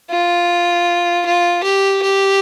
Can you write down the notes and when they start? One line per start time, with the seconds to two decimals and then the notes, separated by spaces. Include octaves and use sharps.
0.10 F4
1.25 F4
1.63 G4
2.02 G4